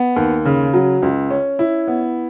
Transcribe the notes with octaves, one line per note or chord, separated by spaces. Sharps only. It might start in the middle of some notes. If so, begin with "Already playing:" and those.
Already playing: B3
D#2
C#3
F#3
C#2
C#4
E4
B3